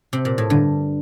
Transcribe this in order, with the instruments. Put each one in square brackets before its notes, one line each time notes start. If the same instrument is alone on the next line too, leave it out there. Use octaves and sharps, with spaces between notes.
[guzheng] C3
A#2
A2
[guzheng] G2 [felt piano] D3